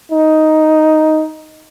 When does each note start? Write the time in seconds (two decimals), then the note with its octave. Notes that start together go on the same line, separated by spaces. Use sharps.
0.12 D#4